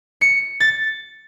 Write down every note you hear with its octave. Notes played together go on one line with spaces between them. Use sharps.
C#7
A6